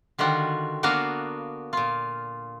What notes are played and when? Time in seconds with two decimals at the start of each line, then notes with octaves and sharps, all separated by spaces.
0.18 D3 D#3 G3 F4 F#4
0.83 A#3 B3 D4 F#4 A#4 F5
1.73 A#2 F4